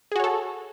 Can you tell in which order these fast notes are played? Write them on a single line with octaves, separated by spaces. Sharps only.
G#4 F#4 C#5 A4